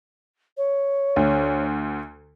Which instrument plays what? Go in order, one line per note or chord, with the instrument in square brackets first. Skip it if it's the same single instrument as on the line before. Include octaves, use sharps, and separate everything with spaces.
[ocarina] C#5
[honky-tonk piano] D2